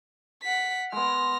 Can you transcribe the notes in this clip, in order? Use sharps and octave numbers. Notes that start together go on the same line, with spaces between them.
F#5 B6
G#3 B3 F6 A#6